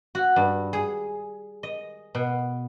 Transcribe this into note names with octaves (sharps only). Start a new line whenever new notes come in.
F#4
G2
G#4
D#5
B2